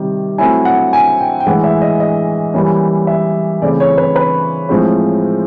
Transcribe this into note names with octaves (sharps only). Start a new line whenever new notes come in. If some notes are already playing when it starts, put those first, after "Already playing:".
Already playing: C3 D#3 G3
F#3 A3 C4 E4 G#5
F#5
G#5
G5
G5
A2 E3 G#3 F#5
E5
D#5
D#5
E3 G3 A#3 C#4
E5
C#3 E3 A3 C4 D5
C#5
B4
B4
A2 F3 G#3 C4